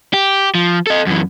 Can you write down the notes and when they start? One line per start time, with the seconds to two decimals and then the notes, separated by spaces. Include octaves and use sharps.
0.14 G4
0.55 F3
0.87 A4 D#5
1.07 F#2 E3